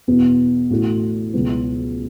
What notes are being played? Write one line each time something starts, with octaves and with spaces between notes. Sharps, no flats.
E2 B2 B3
A1 A2 A3 F#4
C#2 B2 F#3 B3